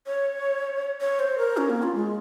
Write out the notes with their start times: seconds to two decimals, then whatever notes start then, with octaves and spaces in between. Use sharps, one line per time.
0.06 C#5
1.01 C#5
1.19 C5
1.38 A#4
1.57 C#4
1.70 A#3
1.82 F4
1.95 G#3